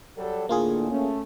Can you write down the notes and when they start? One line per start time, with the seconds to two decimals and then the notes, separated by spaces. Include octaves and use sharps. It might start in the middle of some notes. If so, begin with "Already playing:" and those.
0.18 F#3 G3 A4
0.49 A2 D3 A#3 F4 G#4
0.91 A3 C#4